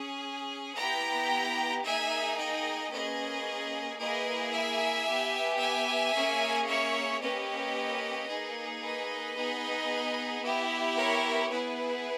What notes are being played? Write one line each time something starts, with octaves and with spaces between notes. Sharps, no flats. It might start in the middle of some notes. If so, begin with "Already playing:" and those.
Already playing: C#4 G#4
B3 E4 G4 G5 A#5
A#3 D#4 G#4 E5 G#5
D#5 G5
A#3 C#4 G#4 B4 D#5
A#3 E4 G#4 B4 D#5
E5 G#5
B3 G4
E5 G#5
A#3 C#4 G#4
C#5 E5
A#3 C#4 G4 B4 D#5
A#3 D#4 G#4
B4 D#5
B3 D#4 G#4
B3 E4 G4
A#4 C#5
B3 E4 G#4 B4